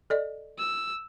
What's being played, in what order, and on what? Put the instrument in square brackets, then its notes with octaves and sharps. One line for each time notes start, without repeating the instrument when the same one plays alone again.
[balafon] A4 D5 D#5
[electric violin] E6